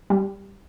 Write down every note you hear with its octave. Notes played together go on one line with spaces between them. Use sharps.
G3